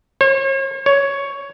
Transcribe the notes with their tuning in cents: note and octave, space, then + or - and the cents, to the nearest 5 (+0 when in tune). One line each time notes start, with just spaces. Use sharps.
C#5 -40
C#5 +10